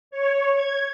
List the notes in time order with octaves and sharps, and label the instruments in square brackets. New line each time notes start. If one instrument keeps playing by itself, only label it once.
[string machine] C#5
G#6